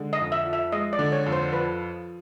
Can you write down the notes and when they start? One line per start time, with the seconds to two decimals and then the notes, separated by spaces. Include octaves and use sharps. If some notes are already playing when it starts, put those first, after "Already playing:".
Already playing: D3 G#3
0.13 D#5
0.19 F2
0.32 E5
0.46 F3
0.53 E5
0.72 G#3 D#5
0.93 D5
0.99 D3
1.12 C#5
1.26 F2
1.33 C5
1.53 F3 B4